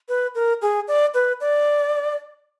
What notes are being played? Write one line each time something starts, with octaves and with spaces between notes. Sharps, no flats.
B4
A#4
G#4
D5
B4
D5